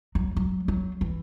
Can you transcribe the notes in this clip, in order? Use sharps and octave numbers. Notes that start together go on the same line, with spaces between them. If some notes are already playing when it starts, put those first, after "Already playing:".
F#3
F#3
F#3
E3